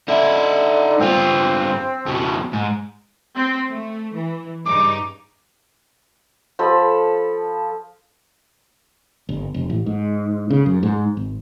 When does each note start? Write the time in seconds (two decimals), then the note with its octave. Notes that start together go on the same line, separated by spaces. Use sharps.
0.08 D3 D#4 E5
1.01 G2 C4 F4
2.06 F2 B2
2.53 G#2
3.35 C4
3.69 A3
4.13 E3
4.66 G2 C#3 D#4 D6
6.59 F3 A4 B5
9.29 G1
9.54 F1
9.70 A1
9.86 G#2
10.50 C#3
10.66 F#2
10.83 G#2
11.17 G#1